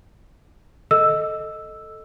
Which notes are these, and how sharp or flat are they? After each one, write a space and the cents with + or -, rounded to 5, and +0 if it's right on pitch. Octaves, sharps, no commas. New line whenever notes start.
A4 +0 D#5 +0 E6 +0